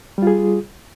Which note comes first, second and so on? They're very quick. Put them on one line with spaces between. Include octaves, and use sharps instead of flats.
G3 F4 G#4